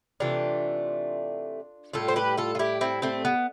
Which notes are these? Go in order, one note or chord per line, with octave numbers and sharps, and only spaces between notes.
C3 E3 A3 D4 F4
A2 G3 F4 A4
C5
G4 B4
F4 A4
F4
E4 G4
C4 E4
A3 C4
B3